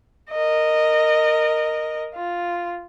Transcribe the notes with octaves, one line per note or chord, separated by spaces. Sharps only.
A#4 D#5
F4